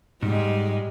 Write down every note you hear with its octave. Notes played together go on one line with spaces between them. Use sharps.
G#2 G3 G#3